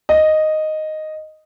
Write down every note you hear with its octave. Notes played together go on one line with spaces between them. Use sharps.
D#5